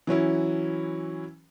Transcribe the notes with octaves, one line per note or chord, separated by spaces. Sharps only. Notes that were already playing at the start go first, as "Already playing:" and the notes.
E3 F#3 C#4 E4